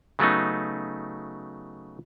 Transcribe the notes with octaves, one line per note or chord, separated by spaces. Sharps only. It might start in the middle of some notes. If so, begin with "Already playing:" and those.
C#3 F#3 A3 B3 D#4